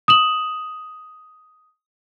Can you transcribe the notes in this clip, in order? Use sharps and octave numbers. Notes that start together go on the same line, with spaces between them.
D#6 E7 F#7